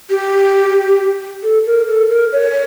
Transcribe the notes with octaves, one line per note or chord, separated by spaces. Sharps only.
G4
A4
A#4
A4
A#4
C#5